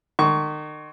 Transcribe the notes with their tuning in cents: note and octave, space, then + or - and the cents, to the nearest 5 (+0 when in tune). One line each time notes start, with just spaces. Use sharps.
D#3 -40 C#6 +20